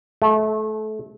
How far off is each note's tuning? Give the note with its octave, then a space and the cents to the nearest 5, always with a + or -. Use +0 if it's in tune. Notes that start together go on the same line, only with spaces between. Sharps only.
A3 -25